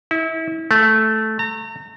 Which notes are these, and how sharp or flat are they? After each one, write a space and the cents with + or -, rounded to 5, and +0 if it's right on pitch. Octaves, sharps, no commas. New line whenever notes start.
E4 -30
A3 -5
A#5 -35